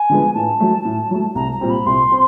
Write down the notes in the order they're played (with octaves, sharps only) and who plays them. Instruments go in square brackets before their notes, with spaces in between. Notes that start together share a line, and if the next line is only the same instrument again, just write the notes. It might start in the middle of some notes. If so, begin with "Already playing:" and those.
Already playing: [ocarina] G#5
[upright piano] D3 F3 G#3 B3
[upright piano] A2 [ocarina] A5
[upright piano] F#3 A3
A2
F#3 A3
[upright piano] C2 [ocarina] A#5
[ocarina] A#5
[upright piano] A#2 G3 C4
[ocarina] B5
[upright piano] C2 [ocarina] C6
[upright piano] C4